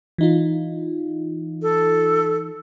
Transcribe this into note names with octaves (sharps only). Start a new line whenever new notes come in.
E3 D#4 F4
A4